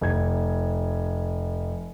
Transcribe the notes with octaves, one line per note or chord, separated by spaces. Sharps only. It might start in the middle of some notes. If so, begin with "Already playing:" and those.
F1 G#6